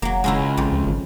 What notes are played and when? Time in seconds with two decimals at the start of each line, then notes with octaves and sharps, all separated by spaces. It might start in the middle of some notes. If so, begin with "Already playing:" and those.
0.02 F1 F#3 A#3
0.24 C#2 G#3 C#4 E4
0.57 A#1 F2
0.72 D2
0.86 G#1